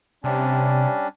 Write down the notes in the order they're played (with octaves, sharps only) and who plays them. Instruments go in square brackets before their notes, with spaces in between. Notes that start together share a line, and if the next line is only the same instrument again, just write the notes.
[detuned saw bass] C3 [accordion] G3 C#4 D4